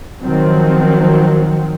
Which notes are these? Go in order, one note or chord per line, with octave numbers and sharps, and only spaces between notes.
D#3 F3 F#3 C4